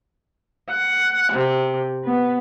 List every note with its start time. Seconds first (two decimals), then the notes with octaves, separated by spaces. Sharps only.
0.69 F#5
1.32 C3
2.04 B3